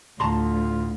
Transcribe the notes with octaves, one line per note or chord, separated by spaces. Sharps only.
D2 A2 F4 A5 A#5 C6